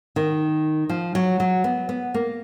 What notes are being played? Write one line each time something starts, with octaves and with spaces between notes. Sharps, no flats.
D#3
F3
F#3
F#3
B3
B3
A#3